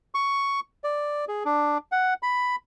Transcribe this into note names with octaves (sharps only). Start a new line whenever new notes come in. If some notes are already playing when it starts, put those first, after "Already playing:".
C#6
D5
G#4
D4
F#5
B5